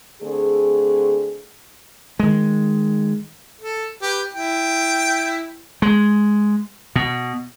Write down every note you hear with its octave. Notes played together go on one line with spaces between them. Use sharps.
D3 A3 C4 G#4
D#3 G#3
A4
G4 B4
E4 G5
G#3
B2